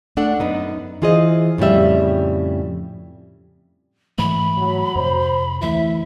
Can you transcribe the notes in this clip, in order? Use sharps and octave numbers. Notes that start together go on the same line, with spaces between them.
A3 D4 A4 F#5
F#2 B3 D#4
E3 F4 G#4 C5 D#5
F2 A2 C#3 G3 E5
G#2 E3 A3 B5
F#3
F2 C3 C5
D2 E3 A3 E4 E5